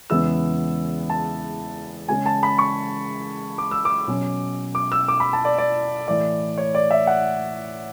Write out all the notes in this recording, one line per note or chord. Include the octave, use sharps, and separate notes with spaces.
E2 C#3 E3 G#3 B3 E6
A5
C#3 G#3 C#4 G#5
A5
B5
C#6
D6
E6
D6
B2 F#3 C#4
D6
E6
D6
B5
A5
D5
D5
A2 E3 A3 D5
C#5
D5
E5
F#5